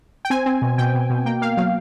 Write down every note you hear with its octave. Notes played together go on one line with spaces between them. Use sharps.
G5
C4 G#5
C4
B2
B2 G5
B2
B2
A#3 G5
A#3 F5
F#3 F5